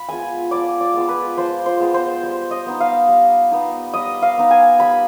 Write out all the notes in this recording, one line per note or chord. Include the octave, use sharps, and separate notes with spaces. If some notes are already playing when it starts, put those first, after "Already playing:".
Already playing: B5
G#3 B3 F4 G#5
F3 D5
D5
G#3 B3 F4
B4
F3 C5
C5
G#3 B3 F4
C5
G3
D#5
B3 D#4
F5
G3
B3 D#4
G3 D#5
F5
B3 D#4
G#5
G3 B5